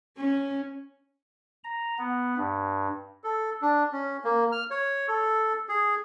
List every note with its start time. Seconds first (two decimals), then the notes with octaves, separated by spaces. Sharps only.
0.17 C#4
1.64 A#5
1.98 B3
2.37 G2
3.24 A4
3.62 D4
3.92 C#4
4.24 A#3
4.52 F6
4.71 C#5
5.08 A4
5.69 G#4